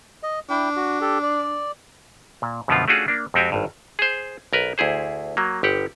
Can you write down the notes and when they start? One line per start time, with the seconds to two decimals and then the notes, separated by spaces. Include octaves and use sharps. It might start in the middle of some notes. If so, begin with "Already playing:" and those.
0.23 D#5
0.50 D4 E4 G5
0.76 F#4
1.01 G4 A4
1.23 D5
2.42 A#2
2.68 F#2 B2 D3 F3 B3 F4
2.88 A3 C#4 D4 F4 F#4 G#4
3.08 A#3 D4
3.34 F2 G#3 C4 F#4 G4 G#5
3.52 G#1 G2
3.99 G#4 C5
4.53 B1 A#4 B4
4.78 D2 E4 G#4 C5
5.37 F#3 A#3
5.63 G1 G4 F#5